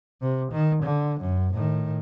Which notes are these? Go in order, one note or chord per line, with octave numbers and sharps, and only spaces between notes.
C3
D#3
D3
F#2
A2 D#3